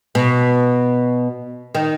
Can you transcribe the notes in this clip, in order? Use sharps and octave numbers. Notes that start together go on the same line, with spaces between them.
B2
D#3